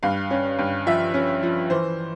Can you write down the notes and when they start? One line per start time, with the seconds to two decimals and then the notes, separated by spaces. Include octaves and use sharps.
0.03 G2 F5
0.31 C#4
0.59 G2
0.86 F3 E5
1.14 C#4
1.43 F3
1.70 E3 C5